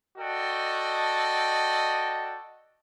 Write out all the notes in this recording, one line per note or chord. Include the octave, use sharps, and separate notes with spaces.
F#4 A4 D5 D#5 G5